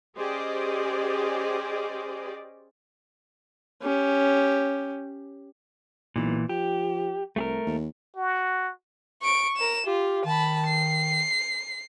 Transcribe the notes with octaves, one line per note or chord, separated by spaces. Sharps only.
C#4 G4 G#4 C5 D5 D#5
C#4 G4
B1 A#2 E3
F3 G4
C2 A3 G#4 A#4
D#2
F#4
C#6 D7
A#4 E7
F4 G4
D#3 A5 B5
C7